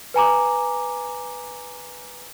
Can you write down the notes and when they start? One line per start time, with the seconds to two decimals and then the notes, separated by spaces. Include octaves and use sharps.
0.14 B4 G#5 A#5 D6